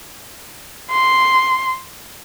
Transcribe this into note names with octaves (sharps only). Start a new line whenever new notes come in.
C6